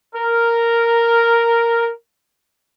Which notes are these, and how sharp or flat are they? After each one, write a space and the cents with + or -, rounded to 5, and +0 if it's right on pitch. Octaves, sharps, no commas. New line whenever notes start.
A#4 -5